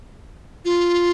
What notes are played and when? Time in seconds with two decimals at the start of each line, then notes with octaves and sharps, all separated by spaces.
0.65 F4